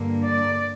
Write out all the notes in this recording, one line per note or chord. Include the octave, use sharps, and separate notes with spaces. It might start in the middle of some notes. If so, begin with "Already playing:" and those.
Already playing: G2 D3 A#3
D5